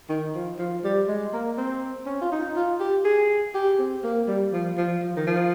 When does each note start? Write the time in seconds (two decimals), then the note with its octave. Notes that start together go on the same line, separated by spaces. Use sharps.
0.09 D#3
0.35 F3
0.58 F3
0.84 G3
1.08 G#3
1.33 A#3
1.57 C4
2.06 C#4
2.21 F4
2.32 D#4
2.56 F4
2.80 G4
3.05 G#4
3.55 G4
3.79 C4
4.04 A#3
4.28 G3
4.53 F3
4.77 F3
5.03 F3
5.17 D#3
5.27 F3